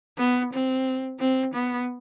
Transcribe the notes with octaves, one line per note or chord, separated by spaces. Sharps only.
B3
C4
C4
B3